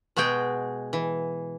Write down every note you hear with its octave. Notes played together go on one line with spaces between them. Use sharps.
B2 G#3 F#4 G#4 G5
E3